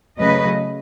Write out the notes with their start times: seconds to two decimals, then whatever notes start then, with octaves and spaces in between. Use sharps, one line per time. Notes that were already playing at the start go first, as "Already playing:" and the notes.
0.18 C#3 F#3 A3 B4 D#5